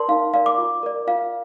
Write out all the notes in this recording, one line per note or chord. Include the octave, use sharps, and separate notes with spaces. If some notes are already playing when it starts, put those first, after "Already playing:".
Already playing: A#4 D5 A5 C6
D#4 F5
A#4 D5 F5
D6
F4
A#4 D5
F4 F5